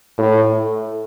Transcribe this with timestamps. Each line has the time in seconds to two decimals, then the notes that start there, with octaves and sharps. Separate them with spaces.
0.18 A2